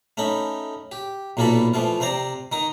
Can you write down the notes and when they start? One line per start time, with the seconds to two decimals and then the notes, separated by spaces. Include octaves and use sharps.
0.17 A3 C#4 D#4 B5
0.92 G4
1.37 B1 A#2 A#3 E4 A4 B5
1.74 E3 F3 A3 F4
2.00 C3 C4 C5 D5 A#5
2.52 D#3 D#4 D#6